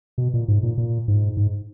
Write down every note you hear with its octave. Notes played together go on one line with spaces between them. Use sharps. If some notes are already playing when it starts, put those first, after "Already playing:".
B2
A#2
G#2
A#2
A#2
G#2
G#2